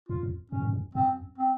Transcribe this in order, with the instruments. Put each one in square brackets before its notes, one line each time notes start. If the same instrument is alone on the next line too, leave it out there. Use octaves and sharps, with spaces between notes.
[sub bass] F2 [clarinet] F4
[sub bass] F2
[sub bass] F#2 [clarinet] C#4
[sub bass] G#2
F#2
[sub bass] F#2 [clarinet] C4
[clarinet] C4